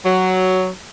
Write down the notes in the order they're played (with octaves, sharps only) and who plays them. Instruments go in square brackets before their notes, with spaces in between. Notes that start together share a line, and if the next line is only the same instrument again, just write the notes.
[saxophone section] F#3